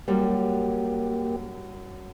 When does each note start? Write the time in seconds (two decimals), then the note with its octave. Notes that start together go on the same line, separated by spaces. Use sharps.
0.08 F#2 G3 A#3 G4